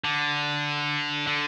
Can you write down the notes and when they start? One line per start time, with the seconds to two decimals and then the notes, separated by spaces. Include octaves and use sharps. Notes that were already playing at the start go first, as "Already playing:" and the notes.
0.04 D3
1.27 D3